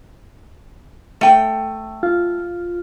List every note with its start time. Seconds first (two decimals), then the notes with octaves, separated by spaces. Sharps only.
1.21 A3 G5
2.03 F4